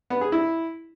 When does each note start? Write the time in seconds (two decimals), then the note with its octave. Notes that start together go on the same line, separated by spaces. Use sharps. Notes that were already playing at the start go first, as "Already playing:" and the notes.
0.10 B3
0.21 G#4
0.32 E4